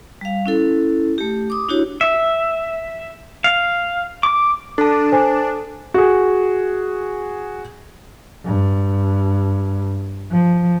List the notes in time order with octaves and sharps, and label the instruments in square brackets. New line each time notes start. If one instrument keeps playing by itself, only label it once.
[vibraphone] G3 F5
C#4 E4 A4
A3 G4
D6 D#6
D4 E4 F#4 G4 C#5
[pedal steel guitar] E5
F5
D6
[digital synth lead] D4 [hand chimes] A4 A5
[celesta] C5 G#5
[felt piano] F#4 G#4
[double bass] G2
F3